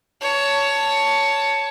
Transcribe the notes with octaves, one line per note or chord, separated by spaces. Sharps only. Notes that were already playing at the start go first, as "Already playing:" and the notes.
C#5 A5